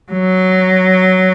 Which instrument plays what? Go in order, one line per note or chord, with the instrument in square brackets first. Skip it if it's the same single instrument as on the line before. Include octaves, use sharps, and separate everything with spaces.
[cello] F#3